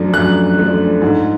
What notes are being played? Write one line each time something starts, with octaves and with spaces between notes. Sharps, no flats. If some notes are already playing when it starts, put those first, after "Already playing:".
Already playing: F#2 F3 A3 D4
F#2 F#6
F3 A3 D4
G#2